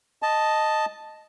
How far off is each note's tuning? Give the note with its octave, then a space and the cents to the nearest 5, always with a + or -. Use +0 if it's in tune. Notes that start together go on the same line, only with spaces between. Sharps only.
D#5 +0 A5 +0